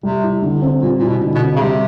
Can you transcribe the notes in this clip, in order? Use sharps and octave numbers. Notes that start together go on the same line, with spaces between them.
C3 G3
E4
D3
C4
A#2 G3
A#2 E4
B2
D3
B2
C4
C#3
C3 G3